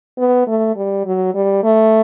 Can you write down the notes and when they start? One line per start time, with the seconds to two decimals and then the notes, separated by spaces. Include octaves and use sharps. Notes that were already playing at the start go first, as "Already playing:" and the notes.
0.18 B3
0.47 A3
0.76 G3
1.05 F#3
1.34 G3
1.63 A3